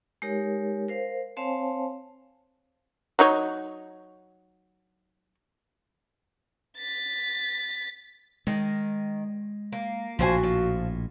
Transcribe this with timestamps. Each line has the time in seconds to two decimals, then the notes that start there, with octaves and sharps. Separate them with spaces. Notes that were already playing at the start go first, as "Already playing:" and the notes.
0.22 G#3 D#4 G4 A#4 C#5
0.89 A#4 C5 F5
1.37 C4 C5 C#5 F5 G#5 A5
3.19 F#3 D#4 C#5
6.78 A6 B6
8.47 D#3 G#3
9.72 A#3
10.19 A#1 A2 F3 F#4 C5 G#5
10.44 F3